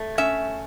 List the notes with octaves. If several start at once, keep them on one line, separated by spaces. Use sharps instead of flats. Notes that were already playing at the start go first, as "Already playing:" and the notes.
Already playing: A3
C#4 E5